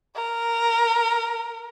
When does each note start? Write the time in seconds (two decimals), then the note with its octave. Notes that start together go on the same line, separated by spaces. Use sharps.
0.16 A#4